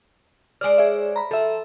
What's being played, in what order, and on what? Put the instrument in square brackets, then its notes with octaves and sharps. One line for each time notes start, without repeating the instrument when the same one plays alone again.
[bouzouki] G#3 C5 D5 [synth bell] F6 D7
[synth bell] G#4 C#5 E5
A#5 B5
[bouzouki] F3 [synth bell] A4 E5